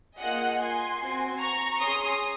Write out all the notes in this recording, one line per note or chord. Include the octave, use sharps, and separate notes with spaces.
A#3 F4 G#4 D#5 F#5
G#5 C6
C4 F#4
A#5 C#6
C#4 G#4 C6 D#6